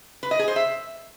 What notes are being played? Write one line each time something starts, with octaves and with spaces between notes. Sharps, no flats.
B4
D#5
G#4
C5
E5